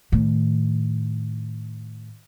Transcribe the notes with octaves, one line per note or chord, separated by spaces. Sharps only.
A2 D#3